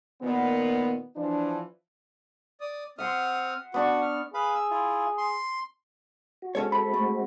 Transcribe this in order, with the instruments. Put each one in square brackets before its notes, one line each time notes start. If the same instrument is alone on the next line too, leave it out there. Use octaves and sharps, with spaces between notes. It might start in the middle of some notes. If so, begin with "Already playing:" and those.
[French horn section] A#2 D#3 B3
E3 F3 D4
[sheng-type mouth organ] D5 D#6
[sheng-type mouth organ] C4 D#6 F6 [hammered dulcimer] E5 F#5 C6
[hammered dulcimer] B3 D4 C#6 [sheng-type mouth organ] F#4 F#5
[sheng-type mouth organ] F6
[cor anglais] G#4 [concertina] B4 F5 B5
[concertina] E6
E4 F4
C6
[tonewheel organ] F#4
[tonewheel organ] G#3 C4 F#4 [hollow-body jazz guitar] C#4 A4 C#5
[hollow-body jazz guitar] A4 [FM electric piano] B5
[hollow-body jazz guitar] A3